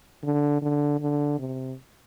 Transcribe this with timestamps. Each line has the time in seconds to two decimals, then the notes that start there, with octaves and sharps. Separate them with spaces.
0.24 D3
0.62 D3
1.00 D3
1.39 C3